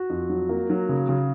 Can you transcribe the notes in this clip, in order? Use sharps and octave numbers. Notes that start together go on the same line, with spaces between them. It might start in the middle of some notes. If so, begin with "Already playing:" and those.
Already playing: F#4
F2
F#3
A#3
F#3
C#3
C#3